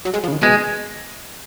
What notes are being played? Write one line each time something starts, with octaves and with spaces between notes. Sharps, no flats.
F#3
G#3
F3
C#3
D#3
B2 G#3